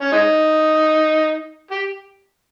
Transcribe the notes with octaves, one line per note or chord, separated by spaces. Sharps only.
C#4
G#3 D#4
G4